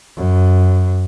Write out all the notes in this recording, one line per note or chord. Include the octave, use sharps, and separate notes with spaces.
F#2